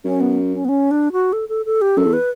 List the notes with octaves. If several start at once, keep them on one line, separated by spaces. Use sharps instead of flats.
F#2 C#4
B3
C#4
B3
C#4
D4
F#4
A4
A4
A4
G4
F#2 A4
E2
B4